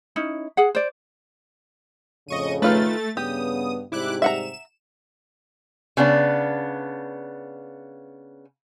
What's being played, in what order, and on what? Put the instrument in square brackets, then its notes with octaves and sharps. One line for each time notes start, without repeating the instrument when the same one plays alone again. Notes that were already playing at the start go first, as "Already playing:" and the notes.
[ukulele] C#4 D#4 E4
G#4 F#5
C5 D5
[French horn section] F2 A2 C#3 [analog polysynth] D#5 C#6 D#7
[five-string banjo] D#3 F4 B4 [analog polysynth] A3 A6
[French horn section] G2 C#3 B3 [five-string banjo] G4 [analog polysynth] D#6
[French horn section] G#2 C3 G3 [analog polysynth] E4 D6 F#6
[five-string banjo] E5 F#5 A#5 [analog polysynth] E7
[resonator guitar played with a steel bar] C#3 B3 D4